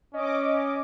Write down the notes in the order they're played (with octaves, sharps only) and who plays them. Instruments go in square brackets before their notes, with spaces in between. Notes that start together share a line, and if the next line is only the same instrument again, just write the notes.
[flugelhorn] C#4 [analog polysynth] D#5 D6